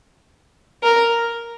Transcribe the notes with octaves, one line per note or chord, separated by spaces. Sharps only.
A#4